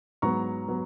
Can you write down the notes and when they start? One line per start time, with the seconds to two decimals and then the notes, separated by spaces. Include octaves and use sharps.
0.22 G#2 F#3 B3 A#5 C#6
0.68 F#3 B3